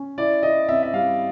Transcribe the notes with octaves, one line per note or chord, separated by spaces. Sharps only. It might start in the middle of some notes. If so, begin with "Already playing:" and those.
Already playing: C#4
E4 D5
E4 D#5
C4 E5
E5
G3 F5